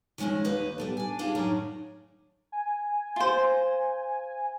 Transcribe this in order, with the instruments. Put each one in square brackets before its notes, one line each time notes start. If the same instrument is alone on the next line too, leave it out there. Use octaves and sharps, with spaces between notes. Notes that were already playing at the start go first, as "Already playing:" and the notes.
[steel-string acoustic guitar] D#3 F3 G#3 C#4 E4
D#2 D#4 B4 D#5
G3 B3 A4
D4 G#5
D4 D#4 F4 G4 G#4
F#2 A2 D#3 C#4 D4 A#5
[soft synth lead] G#5
[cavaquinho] F4 C5